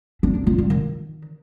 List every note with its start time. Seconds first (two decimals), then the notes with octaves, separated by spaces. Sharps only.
0.23 D4
0.35 D4
0.47 F4
0.58 G3
0.70 D#3